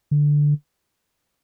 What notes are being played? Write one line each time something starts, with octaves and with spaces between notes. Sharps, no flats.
D3